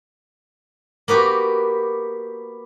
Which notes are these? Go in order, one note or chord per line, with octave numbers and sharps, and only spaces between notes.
A#3 B3 F#4 G4